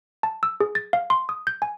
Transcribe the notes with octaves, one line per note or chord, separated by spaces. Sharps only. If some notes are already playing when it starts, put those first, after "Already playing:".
A5
E6
G#4
A6
F5
C6
D#6
G6
G#5